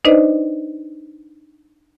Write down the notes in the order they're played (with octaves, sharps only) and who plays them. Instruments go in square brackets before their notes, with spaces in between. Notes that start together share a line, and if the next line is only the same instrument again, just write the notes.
[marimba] D4 D#4 B4 C5 D5 D#5